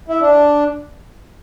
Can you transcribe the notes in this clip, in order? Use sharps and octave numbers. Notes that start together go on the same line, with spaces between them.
E4
D4